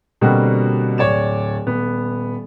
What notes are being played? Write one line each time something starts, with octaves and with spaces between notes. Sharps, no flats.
B2 D3 G3 A#3 C4 F#4
D1 C#5 D5 E7
D#1 B3